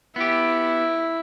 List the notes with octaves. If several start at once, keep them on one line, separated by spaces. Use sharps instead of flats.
B3 E4 G4